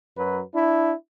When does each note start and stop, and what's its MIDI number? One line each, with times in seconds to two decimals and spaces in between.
0.16 0.41 42
0.16 0.41 54
0.16 0.41 71
0.54 0.92 62
0.54 0.92 64